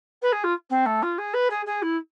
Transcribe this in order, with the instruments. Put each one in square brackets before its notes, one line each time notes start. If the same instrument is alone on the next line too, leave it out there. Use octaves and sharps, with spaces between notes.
[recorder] B4
G#4
F4
C4
A3
F4
G#4
B4
G#4
G#4
E4